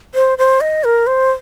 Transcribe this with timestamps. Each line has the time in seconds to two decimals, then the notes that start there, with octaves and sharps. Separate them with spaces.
0.15 C5
0.38 C5
0.61 D#5
0.84 A#4
1.07 C5